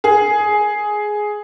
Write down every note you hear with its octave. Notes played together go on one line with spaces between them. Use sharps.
G#4